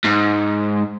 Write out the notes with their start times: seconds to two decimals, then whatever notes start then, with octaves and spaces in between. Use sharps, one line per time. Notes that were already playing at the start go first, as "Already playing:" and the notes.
0.05 G#2